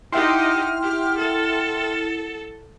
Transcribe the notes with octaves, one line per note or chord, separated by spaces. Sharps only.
D#4 E4 G4 E5 F#5 G5 C6 F6
G4
A4